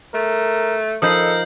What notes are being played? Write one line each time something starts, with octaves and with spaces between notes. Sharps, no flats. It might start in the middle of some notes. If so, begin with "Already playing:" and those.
A3 A#4
F3 D#4 A4 A#4 B5 D#6 G6 C7